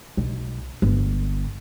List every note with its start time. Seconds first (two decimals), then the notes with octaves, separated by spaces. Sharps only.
0.17 B1
0.82 G1